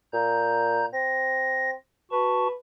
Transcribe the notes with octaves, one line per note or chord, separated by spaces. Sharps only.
A#2 A#5 G6
C4 A#6
F#4 B4 A5 C#6